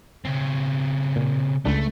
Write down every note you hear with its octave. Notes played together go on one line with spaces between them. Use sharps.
C#3 C4
A#2
C#2 A3 D4